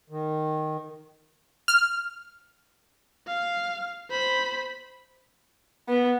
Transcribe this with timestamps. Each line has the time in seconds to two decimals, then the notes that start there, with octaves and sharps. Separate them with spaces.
0.10 D#3
1.68 F6
3.27 F5
4.10 C5 B5
5.89 B3